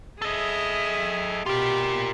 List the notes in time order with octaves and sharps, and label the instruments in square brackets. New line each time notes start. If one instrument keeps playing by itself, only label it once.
[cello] G#4 E5 [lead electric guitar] A4 D#5
[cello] B2 G4 [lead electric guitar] F4 A#4